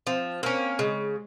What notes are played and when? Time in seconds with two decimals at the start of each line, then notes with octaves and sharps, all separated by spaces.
0.07 F3 C4
0.43 A#3 C4 C#4
0.79 C#3 G#3